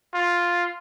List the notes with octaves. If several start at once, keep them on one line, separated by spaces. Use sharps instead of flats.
F4